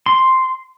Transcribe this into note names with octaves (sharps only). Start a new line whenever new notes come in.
C6